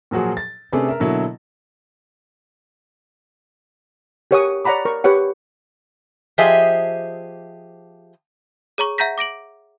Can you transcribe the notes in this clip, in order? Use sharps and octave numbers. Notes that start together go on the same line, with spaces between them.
A#2 F3 F#3 F#4 G#4
A6
C3 A3 C#4 D4 G#4 B4
A#4 E5
B2 D3 F#3 A#3 E4
G4 A#4 C#5 F#5 G#5 D#6
C#5 D5 F#5 A#5 B5 D6
A#4 C#6
G4 B4 C#5 F#5
F3 G4 G#4 C5 D#5 E5
G#4 C#5 A#5 C#6
E5 F#5 A#5 G6 A#6 B6
D6 A#6 D7 F#7